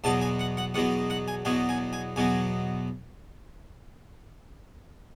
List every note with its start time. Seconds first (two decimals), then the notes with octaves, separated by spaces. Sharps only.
0.04 E2 B2 F#3 A5
0.21 G#5
0.39 F#5
0.57 F#5
0.74 E2 B2 F#3 F#5
1.10 F#5
1.28 G#5
1.45 E2 B2 F#3 G#5
1.69 G#5
1.93 G#5
2.16 E2 B2 F#3 G#5